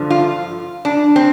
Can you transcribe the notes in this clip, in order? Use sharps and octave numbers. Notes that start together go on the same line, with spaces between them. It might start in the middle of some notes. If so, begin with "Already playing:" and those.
Already playing: G2 D3 F3
F4
D4
C4